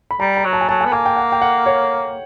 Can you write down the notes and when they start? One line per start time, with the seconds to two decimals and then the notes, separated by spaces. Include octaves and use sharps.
0.11 B5
0.20 G3 A#5
0.37 A#5
0.44 F#3
0.53 A5
0.61 G#5
0.69 F#3 A5
0.81 G#5
0.85 B3
0.93 A#3 G#5
1.06 G5
1.17 F#5
1.32 G5
1.42 F#5
1.66 C#5